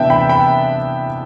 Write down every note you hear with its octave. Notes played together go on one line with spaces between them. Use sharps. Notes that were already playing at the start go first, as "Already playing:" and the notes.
Already playing: C3 E3 B3 D4 E5 G5 A5
G5 B5
G5 B5